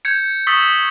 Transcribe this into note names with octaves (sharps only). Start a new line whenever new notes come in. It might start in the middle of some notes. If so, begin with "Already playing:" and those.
G6 G#6 C#7
C#6 D#6 E6 A6 B6